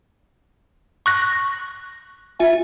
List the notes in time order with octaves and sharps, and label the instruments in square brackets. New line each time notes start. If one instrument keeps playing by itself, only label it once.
[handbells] C#6 F#6 A#6
[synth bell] F4 E5 G#5